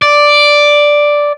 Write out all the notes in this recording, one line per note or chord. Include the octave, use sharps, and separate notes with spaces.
D5